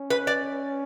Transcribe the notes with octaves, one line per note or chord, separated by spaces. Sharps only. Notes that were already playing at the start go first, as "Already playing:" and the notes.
Already playing: C#4
B4
D5